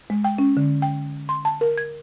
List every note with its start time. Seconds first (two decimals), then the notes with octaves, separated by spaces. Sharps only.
0.10 G#3
0.24 G5
0.39 C#4
0.57 D3
0.82 G5
1.29 C6
1.45 A5
1.61 A#4
1.78 G#6